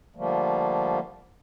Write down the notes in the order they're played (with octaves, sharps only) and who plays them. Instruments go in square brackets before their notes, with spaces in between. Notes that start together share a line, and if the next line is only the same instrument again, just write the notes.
[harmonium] D3 F3 G3 A3 A#3